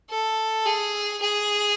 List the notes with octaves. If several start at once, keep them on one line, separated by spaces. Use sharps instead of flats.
A4
G#4
G#4